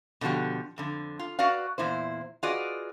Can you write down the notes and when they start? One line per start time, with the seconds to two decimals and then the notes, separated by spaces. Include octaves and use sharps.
0.21 B2 D3 F3 F#4 G4
0.78 F2 D3
1.19 F4
1.39 F#4 B4 D5 F5
1.78 E2 A#2 E4 C5
2.43 F4 F#4 G#4 B4 D5 D#5